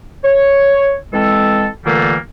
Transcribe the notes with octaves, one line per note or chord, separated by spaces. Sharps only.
C#5
E3 G#3 C4 A4
A#2 D3 E3 G3 A3 A#3